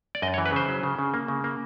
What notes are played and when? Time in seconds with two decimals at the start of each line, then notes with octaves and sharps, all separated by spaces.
0.15 D5
0.22 F#2 D#5
0.34 C#5
0.38 E3
0.46 B4
0.52 C#3 C5
0.68 F#3
0.83 C#3
0.99 C#3
1.14 A#3
1.28 C#3
1.44 A#3